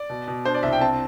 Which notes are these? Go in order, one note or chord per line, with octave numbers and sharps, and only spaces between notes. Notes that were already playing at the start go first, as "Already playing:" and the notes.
Already playing: D5
B2
B2
D4 C5
D5
C2 E5
G5
C4 A5